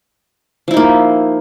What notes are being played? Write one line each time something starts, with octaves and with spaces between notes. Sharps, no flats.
F3 A#3 D#4 E4